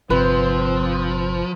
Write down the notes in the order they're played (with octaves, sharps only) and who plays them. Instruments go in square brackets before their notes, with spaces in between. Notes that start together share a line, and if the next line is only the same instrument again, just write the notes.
[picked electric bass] G1 C3 [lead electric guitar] F3 [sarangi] C4 [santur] B4